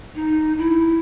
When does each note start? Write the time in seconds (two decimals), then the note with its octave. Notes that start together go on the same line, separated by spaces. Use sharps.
0.15 D#4
0.58 E4